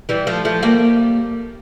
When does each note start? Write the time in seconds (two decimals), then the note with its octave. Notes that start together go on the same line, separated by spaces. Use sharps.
0.09 E3 G3
0.27 F3 A3
0.45 F3 A3
0.63 G3 A#3